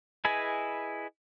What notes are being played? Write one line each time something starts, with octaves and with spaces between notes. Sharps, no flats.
E4 G#4 B4 D#5 G#5